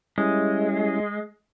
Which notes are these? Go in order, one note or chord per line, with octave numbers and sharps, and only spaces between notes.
G3 G#3 C#4 E4